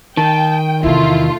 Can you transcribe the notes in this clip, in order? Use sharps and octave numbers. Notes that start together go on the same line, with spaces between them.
D#3 G5 A5
E2 C3 A3 E4 F4